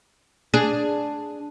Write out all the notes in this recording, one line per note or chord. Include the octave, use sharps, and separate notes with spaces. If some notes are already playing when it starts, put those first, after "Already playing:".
D4 G#4